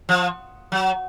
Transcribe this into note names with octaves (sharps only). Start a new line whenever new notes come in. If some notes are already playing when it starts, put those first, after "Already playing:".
F3
F#3